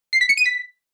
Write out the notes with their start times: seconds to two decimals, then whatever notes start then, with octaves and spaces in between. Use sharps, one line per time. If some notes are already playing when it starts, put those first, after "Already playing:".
0.13 C7
0.21 B6
0.29 C#7
0.37 D#7
0.46 B6